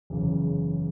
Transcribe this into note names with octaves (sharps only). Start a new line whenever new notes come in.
F#1 E2 C#3